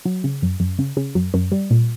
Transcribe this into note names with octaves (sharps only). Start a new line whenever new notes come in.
F#3
C#3
F#2
F#2
C#3
C#3
F#2
F#2
G3
A#2